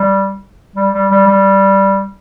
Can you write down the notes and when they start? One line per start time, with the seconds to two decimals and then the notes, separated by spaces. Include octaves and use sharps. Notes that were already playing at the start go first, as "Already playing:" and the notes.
Already playing: G3
0.76 G3
0.94 G3
1.11 G3
1.28 G3